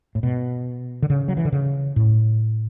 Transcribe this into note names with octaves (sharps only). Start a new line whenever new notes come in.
A2
B2
D3
C#3
F#3
E3
D3
C#3
A2